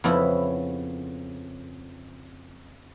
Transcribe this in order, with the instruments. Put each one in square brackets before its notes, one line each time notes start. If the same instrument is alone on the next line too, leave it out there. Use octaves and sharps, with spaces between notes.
[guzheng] F2 C#3 B3 C#4 E4